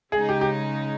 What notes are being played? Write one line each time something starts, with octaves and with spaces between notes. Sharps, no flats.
C#3 G#3 D#4 G#4
G4
G4